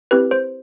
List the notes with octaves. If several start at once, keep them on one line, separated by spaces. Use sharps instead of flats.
C4 E4 G4 B4
C5